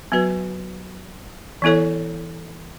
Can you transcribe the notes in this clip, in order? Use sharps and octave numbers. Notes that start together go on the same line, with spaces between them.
F#3 B3 F#4 B4
E3 B3 E4 A4 C#5